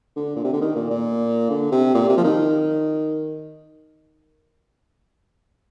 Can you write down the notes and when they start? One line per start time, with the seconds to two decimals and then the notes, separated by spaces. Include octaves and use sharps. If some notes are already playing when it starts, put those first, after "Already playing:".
0.16 D3
0.36 A#2
0.44 C3
0.53 D3
0.61 D#3
0.76 A#2
0.90 A#2
1.50 D3
1.72 C3
1.94 A#2
2.09 C3
2.17 F3
2.24 D#3